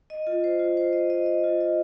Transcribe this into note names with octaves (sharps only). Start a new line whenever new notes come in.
D#5
F4
C5
F4
C5
D#5
D#5
D#5
F4
D#5